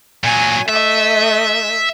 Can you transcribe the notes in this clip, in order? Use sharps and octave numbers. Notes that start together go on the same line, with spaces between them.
A#2 F#3 G#5
A3 D#5 E5